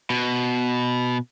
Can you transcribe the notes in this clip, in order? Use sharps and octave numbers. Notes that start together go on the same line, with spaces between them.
B2